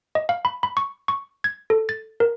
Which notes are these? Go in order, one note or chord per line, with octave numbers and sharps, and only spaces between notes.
D#5
F5
B5
B5
C#6
C#6
G#6
A4
A6
A#4